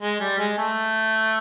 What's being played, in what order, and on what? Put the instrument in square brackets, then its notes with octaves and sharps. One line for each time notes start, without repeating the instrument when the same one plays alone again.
[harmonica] G#3
G3
G#3
A3